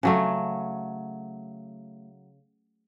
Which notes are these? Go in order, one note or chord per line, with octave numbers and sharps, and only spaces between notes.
C#3 F#3 A3